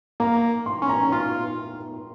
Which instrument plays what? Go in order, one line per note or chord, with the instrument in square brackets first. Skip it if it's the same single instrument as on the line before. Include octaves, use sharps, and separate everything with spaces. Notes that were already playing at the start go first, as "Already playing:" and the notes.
[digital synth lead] A#3 [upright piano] A#5
[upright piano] C6
[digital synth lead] C#4
[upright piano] A#5
[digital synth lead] F4 [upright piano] C6